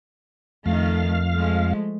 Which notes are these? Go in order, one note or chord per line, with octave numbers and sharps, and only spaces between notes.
F2 D#3 A3 F5
F3 G#3 A3